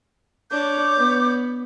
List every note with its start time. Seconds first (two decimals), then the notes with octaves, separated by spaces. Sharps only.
0.51 D4 C#5 D6 G6
0.97 B3